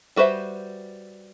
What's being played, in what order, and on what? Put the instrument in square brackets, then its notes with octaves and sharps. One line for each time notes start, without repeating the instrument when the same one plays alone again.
[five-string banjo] G3 F#4 B4 C5 E5